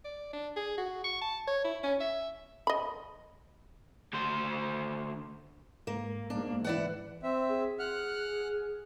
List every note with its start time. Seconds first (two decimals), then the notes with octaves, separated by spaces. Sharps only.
0.05 D5
0.33 D4
0.56 G#4
0.78 F#4
1.04 C#6
1.21 A5
1.47 C#5
1.64 E4
1.83 C#4
2.00 E5
2.67 D#5 B5
4.13 D2 C5
5.87 G#2 G#3 A#3
6.30 G#2 A#3 B3 D4
6.64 E3 E4 D5 F#5
7.23 C4 E5
7.49 G#4
7.79 F#5 F6 F#6